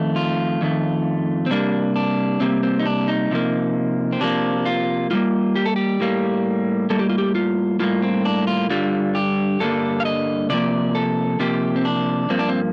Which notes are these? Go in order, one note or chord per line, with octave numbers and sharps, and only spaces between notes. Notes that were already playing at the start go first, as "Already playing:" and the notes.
Already playing: F2 D#3 A3
F4
F2 D#3 A3
C4
C3 G3 A#3 D4
D4
C3 G3 A#3 C4
C4
D#4
D4
D#4
C3 F3 A#3
C4
C3 F3 A#3 D4
F4
A2 G3 A#3 F4
G4
A4
G4
A2 G3 A#3
A2 G3 A#3 A4
G4
F4
G4
F4
A2 G3 A#3 F4
C4
D4
F4
G2 D3 G3 F4
G4
G2 D3 G3 A#3 A4
F5
D#5
C3 F3 A#3 D5
A4
C3 F3 A#3 G4
C4
D4
G2 F3 A#3 C4
D4
C4